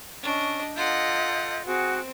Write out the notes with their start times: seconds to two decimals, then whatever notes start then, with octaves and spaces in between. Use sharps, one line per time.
0.23 C#4 D4 D#5
0.76 F4 A4 D#5 F#5 G6
1.65 C4 F#4 G#4 F#5